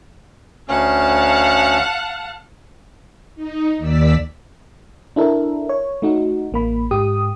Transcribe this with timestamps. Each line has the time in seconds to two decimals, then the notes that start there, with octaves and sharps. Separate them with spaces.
0.68 D2 C#4 F5 F#5 A5
3.35 D#4
3.78 D#2 D5 E6 B6
5.16 D4 E4 A4 A#4
5.69 C#5
6.02 A3 D#4 F#4
6.52 A1 A#3 B5
6.91 G#2 G4 D#6